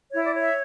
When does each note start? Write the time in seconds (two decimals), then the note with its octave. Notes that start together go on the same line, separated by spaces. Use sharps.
0.09 E4 C#5
0.25 D5
0.35 C#5 E5